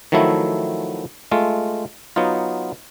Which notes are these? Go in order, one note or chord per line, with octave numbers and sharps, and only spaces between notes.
D#3 F3 F#3 A3 E4
G#3 A3 F4
F#3 B3 D#4 F4